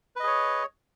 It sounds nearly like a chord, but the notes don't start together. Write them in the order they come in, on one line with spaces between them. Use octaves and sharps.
B4 D#5 G#4 C#5